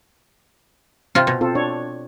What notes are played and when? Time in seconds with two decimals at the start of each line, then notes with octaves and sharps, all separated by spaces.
1.15 C3 C4 F4
1.27 B2
1.41 C4 F4 A4
1.55 D4 C#5